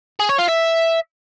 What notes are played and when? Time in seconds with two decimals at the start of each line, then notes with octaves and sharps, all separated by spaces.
0.20 G#4
0.29 C#5
0.38 F4
0.48 E5